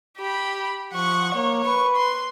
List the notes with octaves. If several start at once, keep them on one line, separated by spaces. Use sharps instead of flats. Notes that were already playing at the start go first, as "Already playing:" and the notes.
G4 B5
F3 F#5 C#6
A#3 C#5
B4 C#6
C6